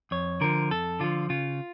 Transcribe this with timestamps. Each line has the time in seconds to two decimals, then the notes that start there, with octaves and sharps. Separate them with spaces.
0.11 F2 C#5
0.41 D3 F3 A#4
0.70 F2 A4
1.00 D3 F3 F4
1.30 C#3 F4